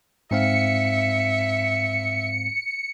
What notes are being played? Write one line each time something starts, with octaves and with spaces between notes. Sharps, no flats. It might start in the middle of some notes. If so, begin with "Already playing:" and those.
G#2 C4 E5 F5 C#7